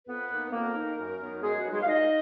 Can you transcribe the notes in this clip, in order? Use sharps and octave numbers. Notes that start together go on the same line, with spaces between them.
F2 B3 B4
D#3 A#3 D#4
F2 A#3 A#4
D#3 A#3 D#4
F#2
D#3 F#3 B3 D#4
F#2 G#3 G#4
F#4
D#3 F#3 B3 D#4
G#3 G#4
F5
A#2 D#4 D#5